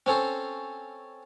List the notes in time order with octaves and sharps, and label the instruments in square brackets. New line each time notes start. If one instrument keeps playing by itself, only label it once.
[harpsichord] C4 C#4 A4 C5